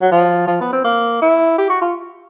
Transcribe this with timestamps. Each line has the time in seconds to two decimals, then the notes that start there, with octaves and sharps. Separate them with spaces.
0.02 F#3
0.12 F3
0.47 F3
0.61 B3
0.73 C4
0.84 A#3
1.22 E4
1.58 G4
1.70 F#4
1.81 F4